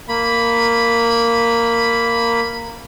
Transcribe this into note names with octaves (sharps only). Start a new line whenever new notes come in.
A#3 B5